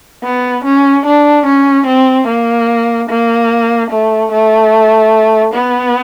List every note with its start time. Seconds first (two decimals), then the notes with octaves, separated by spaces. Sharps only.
0.23 B3
0.64 C#4
1.06 D4
1.46 C#4
1.87 C4
2.27 A#3
3.09 A#3
3.90 A3
4.32 A3
5.54 B3